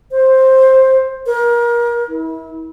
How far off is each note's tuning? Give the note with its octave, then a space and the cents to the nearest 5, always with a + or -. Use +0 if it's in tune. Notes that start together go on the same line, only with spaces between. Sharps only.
C5 +10
A#4 +30
E4 -30